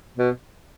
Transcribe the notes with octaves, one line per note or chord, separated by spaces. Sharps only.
B2